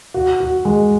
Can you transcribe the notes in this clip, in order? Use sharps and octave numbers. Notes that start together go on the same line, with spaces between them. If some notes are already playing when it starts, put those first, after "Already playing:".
F#4
F#4
G#3